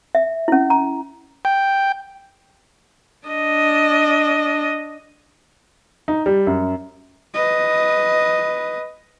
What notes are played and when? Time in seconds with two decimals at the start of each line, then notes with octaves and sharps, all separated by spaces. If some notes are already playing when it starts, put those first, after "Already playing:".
0.15 E5
0.48 C#4 E4
0.70 A#5
1.45 G5
3.28 D4 D#5
6.08 D#4
6.26 G3
6.47 F#2
7.34 B4 D#5